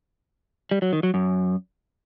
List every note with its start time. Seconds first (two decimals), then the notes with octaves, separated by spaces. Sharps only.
0.71 G3
0.82 F#3
0.93 D#3
1.03 F#3
1.14 F#2